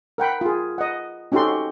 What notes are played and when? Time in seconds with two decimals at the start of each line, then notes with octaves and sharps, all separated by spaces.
0.18 A#4 F#5 G5 B5
0.41 F4 G#4
0.78 D#5 F#5
1.32 C#4 D#4 F#4 G4 A4 C6